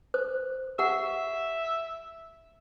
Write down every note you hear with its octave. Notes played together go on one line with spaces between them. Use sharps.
C5
G4 E5 F#5